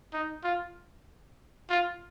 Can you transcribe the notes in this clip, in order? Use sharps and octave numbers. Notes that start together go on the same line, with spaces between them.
D#4
F4
F4